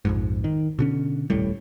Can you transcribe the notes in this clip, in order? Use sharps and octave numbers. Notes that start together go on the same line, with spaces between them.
A#1 F2 G#2
D#3
B2 D3 C#4
D#1 C2 A2 G3